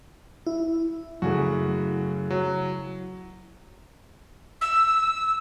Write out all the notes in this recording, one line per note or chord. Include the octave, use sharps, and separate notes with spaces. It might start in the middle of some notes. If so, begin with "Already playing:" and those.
E4
F#2 C#3 A3 F#4
F#3
E6